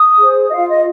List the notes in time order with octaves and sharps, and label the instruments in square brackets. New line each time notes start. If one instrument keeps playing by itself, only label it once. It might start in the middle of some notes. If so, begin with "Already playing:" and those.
Already playing: [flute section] D#6
G#4 C5
D#5
F4 F5
D#5